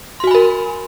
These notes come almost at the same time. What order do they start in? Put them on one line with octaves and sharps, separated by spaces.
C6 F#4 G#5 B5 A#4